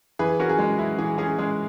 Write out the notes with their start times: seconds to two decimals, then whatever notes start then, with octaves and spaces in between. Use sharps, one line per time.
0.19 E3 G#4 B4
0.40 C#4 F#4 A#4
0.49 G#4
0.59 G#3
0.79 E4
0.98 E3 G#4
1.18 C#4 G#4
1.38 G#3 G#4